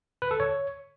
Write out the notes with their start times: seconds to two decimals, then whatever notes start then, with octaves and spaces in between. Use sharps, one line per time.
0.22 B4
0.31 A4
0.40 C#5